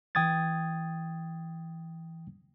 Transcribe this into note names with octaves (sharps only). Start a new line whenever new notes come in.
E3 G5 D#6 G#6 A6